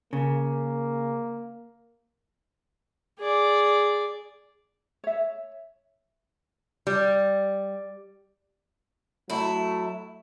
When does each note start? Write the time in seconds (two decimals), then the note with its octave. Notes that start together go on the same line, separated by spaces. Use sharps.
0.13 C#3 A#3
3.19 G#4 D5
5.04 C#5 E5
6.87 G3
9.30 F#3 A3 E4